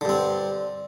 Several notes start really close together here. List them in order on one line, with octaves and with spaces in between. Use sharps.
D3 G2 C4